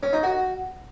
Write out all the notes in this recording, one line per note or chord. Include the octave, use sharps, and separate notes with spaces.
C#4
D#4
F#4